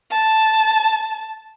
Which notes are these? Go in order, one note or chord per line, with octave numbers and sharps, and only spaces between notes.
A5